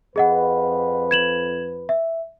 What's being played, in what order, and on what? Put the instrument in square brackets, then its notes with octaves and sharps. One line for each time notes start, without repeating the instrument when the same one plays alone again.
[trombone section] F2 B4 [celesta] G#4 D#5 F#5
[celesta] G#6 E7 F#7
E5